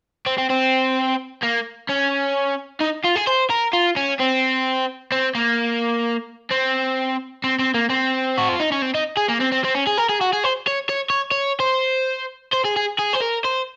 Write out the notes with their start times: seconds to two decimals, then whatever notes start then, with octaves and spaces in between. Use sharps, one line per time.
0.26 C4
0.38 C4
0.50 C4
1.43 A#3
1.89 C#4
2.80 D#4
3.04 F4
3.15 G#4
3.27 C5
3.50 A#4
3.73 F4
3.96 C#4
4.20 C4
5.12 C4
5.35 A#3
6.51 C4
7.44 C4
7.59 C4
7.74 A#3
7.90 C4
8.38 F#4
8.49 F4
8.60 D#4
8.72 C#4
8.82 C4
8.94 D#4
9.17 G#4
9.28 A#3
9.40 C4
9.52 C4
9.64 C4
9.75 C#4
9.87 G#4
9.98 A#4
10.10 G#4
10.21 F#4
10.33 G#4
10.44 C5
10.68 C#5
10.89 C#5
11.10 C#5
11.31 C#5
11.60 C5
12.52 C5
12.64 G#4
12.76 G#4
12.99 G#4
13.14 C5
13.22 A#4
13.45 C5